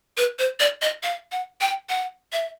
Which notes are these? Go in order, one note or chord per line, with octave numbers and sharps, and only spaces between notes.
B4
C5
D5
D#5
F5
F#5
G5
F#5
E5